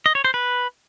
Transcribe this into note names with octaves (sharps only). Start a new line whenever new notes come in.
D#5
C#5
C5
B4